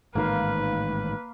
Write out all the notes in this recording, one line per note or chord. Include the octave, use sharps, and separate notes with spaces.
A1 G#2 D#3 A#3 B4 F5